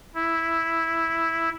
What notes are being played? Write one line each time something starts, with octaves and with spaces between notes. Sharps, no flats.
E4